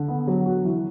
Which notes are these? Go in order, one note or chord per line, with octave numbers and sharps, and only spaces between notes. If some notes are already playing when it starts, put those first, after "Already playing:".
Already playing: D3
B3
F#3
F#4
E3